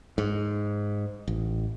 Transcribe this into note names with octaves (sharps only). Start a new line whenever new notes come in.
G#2
A1